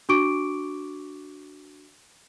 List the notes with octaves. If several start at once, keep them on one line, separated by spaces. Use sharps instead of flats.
D4 F#4 C#6 D6 D7